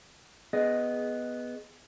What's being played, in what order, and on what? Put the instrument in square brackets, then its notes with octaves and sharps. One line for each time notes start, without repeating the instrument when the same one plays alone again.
[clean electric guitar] B3 G#4 D#5